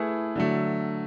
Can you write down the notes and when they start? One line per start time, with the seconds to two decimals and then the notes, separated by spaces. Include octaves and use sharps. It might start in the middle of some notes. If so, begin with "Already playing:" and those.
Already playing: A3 E4 G#4 B4
0.36 D3 F#3 A3